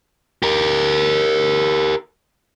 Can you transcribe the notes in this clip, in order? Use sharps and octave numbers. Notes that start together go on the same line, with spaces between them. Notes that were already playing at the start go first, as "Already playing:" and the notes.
G4 A#4